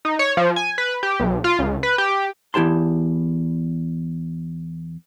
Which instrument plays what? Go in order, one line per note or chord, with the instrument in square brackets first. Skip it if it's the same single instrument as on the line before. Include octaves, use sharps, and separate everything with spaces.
[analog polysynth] D#4
C#5
F3
G#5
B4
G4
B1
F4
C#2
B4
G4
[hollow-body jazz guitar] E2 E4 G4 A5 C6